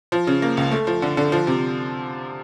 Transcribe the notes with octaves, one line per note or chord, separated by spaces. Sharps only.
F3
C#3
A#3
C#2
A3
F3
D3
D3
F3
C3